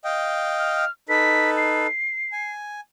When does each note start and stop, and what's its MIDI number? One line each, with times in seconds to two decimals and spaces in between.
0.05 0.85 75
0.05 0.85 77
0.05 0.85 79
0.58 0.90 89
1.09 1.87 63
1.09 1.87 69
1.09 1.87 71
1.09 1.50 95
1.57 2.51 96
2.32 2.80 80